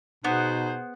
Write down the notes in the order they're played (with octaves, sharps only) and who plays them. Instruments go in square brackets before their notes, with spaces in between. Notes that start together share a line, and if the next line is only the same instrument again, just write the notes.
[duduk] B2 [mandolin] B3 [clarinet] D#4 [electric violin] G#4 C5